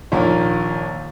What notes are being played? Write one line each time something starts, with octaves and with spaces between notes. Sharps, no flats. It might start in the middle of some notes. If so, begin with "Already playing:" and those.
A#1 D#2 A#3